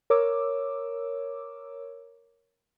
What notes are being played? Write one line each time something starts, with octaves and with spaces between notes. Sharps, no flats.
A#4 C#5 D6 E6